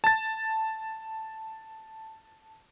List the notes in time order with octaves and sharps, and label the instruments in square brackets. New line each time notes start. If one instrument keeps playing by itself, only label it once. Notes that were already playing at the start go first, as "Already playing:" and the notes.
[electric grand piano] A5 A6